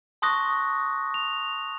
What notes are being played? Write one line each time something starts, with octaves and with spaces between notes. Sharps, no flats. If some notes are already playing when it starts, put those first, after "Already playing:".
A5 C6 C#6 D#6 F#6 A#6
F7